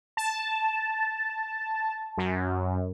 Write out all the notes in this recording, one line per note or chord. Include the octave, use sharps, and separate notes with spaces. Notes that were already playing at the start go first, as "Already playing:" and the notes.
A5
F#2